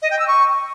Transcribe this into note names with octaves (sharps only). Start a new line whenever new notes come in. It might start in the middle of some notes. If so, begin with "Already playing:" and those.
D#5
G5
E6
C#6